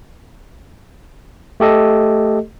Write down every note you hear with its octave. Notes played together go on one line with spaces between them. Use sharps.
A3 G4 A4 D#5